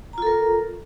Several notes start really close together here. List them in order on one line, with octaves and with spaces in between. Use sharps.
A#5 F4 A4 A#4